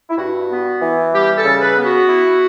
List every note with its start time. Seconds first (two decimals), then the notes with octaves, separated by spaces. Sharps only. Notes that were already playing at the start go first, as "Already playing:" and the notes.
0.10 E4
0.18 G2 F#4
0.50 B3
0.81 E3
1.13 G3 G4
1.36 A4
1.44 C#3
1.61 B4
1.76 B3
1.84 F#4
2.08 E4